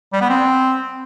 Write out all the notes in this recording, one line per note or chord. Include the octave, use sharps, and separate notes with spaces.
G3
B3
C4